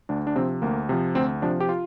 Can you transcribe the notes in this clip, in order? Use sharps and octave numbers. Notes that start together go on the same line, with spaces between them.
D2 D4
D4
C3 F3 C4
D2 A#3
C3 F3
D2 C4
C3 F3 D4
G4
F4